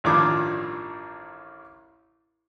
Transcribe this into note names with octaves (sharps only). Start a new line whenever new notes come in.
A1 G2 D#3 F3 D4 D6